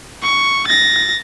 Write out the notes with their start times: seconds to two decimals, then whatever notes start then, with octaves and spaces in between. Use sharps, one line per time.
0.22 C#6
0.67 A6 A#6